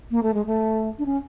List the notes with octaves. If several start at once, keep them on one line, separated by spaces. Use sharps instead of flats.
A#3
A3
G#3
A3
D4
C#4